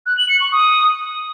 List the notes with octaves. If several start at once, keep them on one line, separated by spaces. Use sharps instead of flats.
F#6
F#7
C#7
C#6
D#6